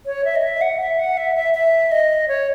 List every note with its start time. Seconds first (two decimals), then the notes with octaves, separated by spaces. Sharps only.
0.06 C#5
0.25 E5
0.36 D#5
0.43 E5
0.61 F#5
0.80 E5
0.99 F#5
1.17 E5
1.36 E5
1.54 E5
1.91 D#5
2.28 C#5